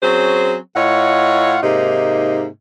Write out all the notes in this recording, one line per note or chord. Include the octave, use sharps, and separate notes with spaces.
F#3 C4 C#4 G#4 C5
A2 F4 C#5 D#5 F#5
G#2 C3 A#3 D#4